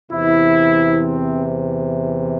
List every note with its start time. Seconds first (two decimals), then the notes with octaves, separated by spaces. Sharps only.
0.12 E2 C3 E3 E4
1.00 C4